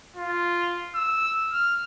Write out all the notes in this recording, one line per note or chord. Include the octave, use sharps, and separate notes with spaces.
F4
E6
F6